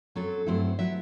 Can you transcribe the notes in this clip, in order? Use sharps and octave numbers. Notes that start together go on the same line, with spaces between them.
F#2 F#3 C4 A4
G2 F#3 A3 C4 E4 C5
F#3 B3 E4 E5